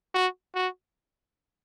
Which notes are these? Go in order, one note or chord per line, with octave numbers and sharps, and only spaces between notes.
F#4
F#4